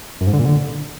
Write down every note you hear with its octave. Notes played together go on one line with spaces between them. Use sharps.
F#2
G#2
D3
A#2
D3